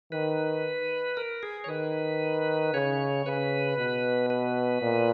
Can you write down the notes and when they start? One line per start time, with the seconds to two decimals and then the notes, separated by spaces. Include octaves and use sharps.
0.12 D#3 B4
1.17 A#4
1.43 G#4
1.64 C#5
1.68 D#3 B4
2.74 C#3 C#5
3.25 C#3 B4
3.77 B2
4.30 B4
4.82 A#2